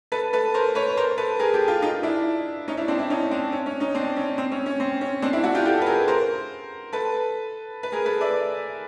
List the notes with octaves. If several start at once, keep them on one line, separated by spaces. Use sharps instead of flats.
A4 B4
A4 B4
A#4 C5
B4 C#5
A#4 C5
A4 B4
G#4 A#4
G4 A4
F4 G4
D#4 F4
D4 E4
C#4 D#4
D4 E4
C4 D4
D4 E4
C#4 D#4
C4 D4
C#4
C#4
C#4 D#4
C4 D4
C#4
C4
C#4
C#4
C4
C#4
C4 D4
D4 E4
E4 F#4
F4 G4
G4 A4
B4
G#4 A#4
A#4 C5
A4 B4
B4
G#4 A#4
A4 B4
D5 E5